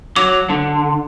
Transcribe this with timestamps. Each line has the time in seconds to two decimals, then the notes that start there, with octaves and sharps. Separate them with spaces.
0.16 F#3 D6
0.49 D3